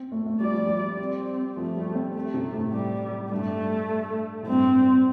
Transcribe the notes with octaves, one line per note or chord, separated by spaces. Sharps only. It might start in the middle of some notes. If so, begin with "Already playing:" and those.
Already playing: C4
A3
A3
G3 D5
F3
G3
C4
F3 A3
G3
C4
A3
C3
A2
G3
G2 A3
A2
G2 C4